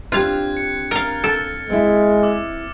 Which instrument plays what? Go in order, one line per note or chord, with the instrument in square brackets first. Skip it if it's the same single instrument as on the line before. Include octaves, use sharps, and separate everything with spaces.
[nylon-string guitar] C4 D4 G4 [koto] F4 F5 [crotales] F#6 G#6
[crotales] C#7
[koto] A#4 F5 [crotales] F6 A6
[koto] A4
[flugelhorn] G#3 [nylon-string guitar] C4 E4
[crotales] D6 E6